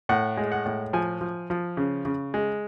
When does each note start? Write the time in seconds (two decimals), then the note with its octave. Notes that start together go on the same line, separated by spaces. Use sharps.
0.09 A2 F#5
0.37 G#3
0.52 F#5
0.66 A2
0.93 F3 G#5
1.21 F3
1.50 F3
1.77 C#3
2.05 C#3
2.34 G#3